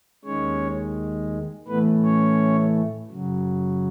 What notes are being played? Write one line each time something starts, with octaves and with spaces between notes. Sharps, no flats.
D#2 D#3 G#3 C#4 C#5
A2 E3 A3 B3 B4
C#4 C#5
F#2 C#3 F#3